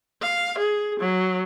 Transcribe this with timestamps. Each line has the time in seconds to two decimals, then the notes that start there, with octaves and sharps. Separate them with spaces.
0.22 F5
0.58 G#4
1.00 F#3